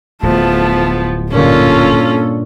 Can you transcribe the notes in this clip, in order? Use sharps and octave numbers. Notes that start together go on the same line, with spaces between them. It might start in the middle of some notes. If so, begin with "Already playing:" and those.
D1 F3 A3 B3 A5 F#6
G2 A#2 D3 A#3 C#4 F4 A4